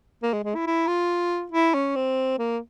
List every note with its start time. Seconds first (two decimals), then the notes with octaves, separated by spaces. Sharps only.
0.23 A#3
0.33 G#3
0.44 G#3
0.55 E4
0.66 E4
0.87 F4
1.52 E4
1.74 C#4
1.95 C4
2.39 A#3